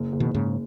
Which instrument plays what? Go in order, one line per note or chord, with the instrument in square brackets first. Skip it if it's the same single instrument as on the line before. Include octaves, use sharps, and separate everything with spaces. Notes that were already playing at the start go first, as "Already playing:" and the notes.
Already playing: [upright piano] F#1
F#1
[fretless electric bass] B2 D#3
[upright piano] F#1 [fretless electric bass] G#2 C#3